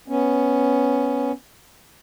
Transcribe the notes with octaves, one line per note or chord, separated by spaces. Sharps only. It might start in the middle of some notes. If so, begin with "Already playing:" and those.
B3 C#4